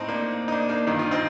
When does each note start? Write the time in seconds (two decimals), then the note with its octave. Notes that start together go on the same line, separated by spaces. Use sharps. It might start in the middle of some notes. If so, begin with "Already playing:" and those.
Already playing: A2 C4 D#4
0.08 A#3 D4
0.48 D#4
0.52 A#3 D4
0.69 A#3 D4
0.87 G2 D#3 D#4
0.99 F4
1.11 C4 D#4